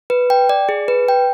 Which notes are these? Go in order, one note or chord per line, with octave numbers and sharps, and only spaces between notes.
B4
G5
D5
G#4
B4
G5